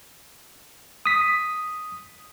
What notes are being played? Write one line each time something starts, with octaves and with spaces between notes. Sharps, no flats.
D#6 B6